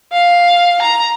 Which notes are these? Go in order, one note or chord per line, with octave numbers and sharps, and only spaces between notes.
F5
A#5